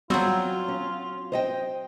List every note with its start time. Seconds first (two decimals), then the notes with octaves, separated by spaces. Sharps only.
0.10 F#3 G3 B3 C4 F4 F#4
0.68 C#4
1.32 C5 D#5 G5